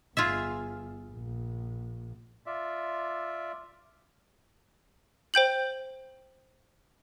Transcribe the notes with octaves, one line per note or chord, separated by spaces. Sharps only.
G1 F4 G#4 E5
A#1
F4 D5 E5
C5 G5 G6 F#7